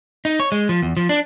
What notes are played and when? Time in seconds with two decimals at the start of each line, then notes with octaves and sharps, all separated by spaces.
0.25 D#4
0.40 C#5
0.52 G#3
0.69 F3
0.82 E2
0.97 F3
1.09 D4